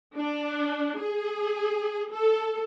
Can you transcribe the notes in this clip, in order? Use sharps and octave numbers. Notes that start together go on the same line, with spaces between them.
D4
G#4
A4